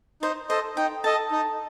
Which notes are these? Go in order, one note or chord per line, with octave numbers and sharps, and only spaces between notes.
D#4 C5
A4 C5 D#5
D#4 G5
A4 D#5 A5
D#4